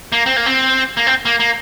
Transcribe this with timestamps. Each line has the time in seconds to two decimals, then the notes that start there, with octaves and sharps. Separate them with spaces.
0.12 A#3
0.26 C4
0.36 A#3
0.46 C4
0.97 A#3
1.07 C4
1.25 A#3
1.40 A#3